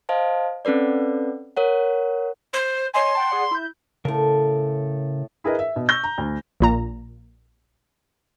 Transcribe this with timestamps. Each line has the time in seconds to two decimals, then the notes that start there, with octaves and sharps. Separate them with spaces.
0.09 C5 D#5 F5 A5
0.65 C4 C#4 A4 B4 D5
1.57 A#4 C#5 F#5
2.53 C5
2.94 C#5 D#5 G#5 C6
3.15 F#5 G5 A5
3.30 G#4 D5 F#5
3.51 E4 G6
4.05 A2 C#3 A4 A#4
5.44 E4 G#4 A#4 B4 D#5
5.59 E5
5.76 B2
5.89 C#6 E6 G6 A#6
6.04 A#5
6.18 D2
6.60 A#1 A#2 A#5